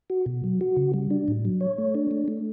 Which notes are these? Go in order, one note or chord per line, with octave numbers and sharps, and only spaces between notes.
F#4
B2
F#3
F#4
C#3
G3
D4
A2
F#3
C#5
A3
D4
A3
A3